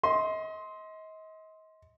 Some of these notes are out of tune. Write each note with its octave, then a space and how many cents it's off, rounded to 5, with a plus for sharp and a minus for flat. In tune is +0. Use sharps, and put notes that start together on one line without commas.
D#5 +35 C6 +0